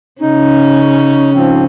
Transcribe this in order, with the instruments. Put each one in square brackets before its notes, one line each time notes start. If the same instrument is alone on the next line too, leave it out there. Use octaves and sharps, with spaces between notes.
[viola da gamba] C#3 C#4 [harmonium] D#4
[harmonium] G#2 F3 C4